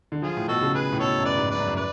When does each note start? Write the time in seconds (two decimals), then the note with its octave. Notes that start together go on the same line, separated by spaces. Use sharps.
0.12 D3
0.22 F3 F4 G#4
0.37 A2
0.48 B2 F#4 A4
0.62 C#3
0.74 G#4 B4
0.93 A2
0.99 B2 A4 C#5
1.18 F#2
1.25 B4 D5
1.37 G#2
1.51 B4 D5
1.56 F#2
1.67 F#2
1.76 B4 D5